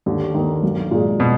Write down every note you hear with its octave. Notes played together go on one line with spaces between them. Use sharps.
D#2 D3
D#3 A#3
B1
A#2 G#3
B2